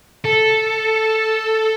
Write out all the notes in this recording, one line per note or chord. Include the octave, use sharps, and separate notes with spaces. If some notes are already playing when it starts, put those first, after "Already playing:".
A4